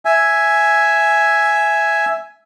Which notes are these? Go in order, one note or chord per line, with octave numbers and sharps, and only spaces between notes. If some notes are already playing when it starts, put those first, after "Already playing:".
E5 G#5